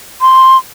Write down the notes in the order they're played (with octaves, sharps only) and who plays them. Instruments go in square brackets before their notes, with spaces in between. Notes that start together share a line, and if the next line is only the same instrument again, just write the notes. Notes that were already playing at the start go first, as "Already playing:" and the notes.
[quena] C6